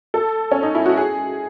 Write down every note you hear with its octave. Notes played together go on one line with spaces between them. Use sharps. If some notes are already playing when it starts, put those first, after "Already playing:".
A4
C#4
D#4
E4
F#4
G#4